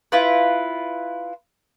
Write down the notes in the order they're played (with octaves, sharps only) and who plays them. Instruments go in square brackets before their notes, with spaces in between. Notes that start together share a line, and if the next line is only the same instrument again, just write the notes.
[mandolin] E4 F4 B4